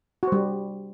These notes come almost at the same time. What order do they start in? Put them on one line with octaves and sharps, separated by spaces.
F#4 C5 G3